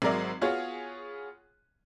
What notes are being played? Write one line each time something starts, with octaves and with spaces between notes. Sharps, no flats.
G#1 F#3 G#3 A#4 D5 E5
B3 F4 F#4 G#4 C#5